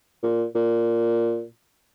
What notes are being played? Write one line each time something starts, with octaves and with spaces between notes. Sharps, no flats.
A#2
A#2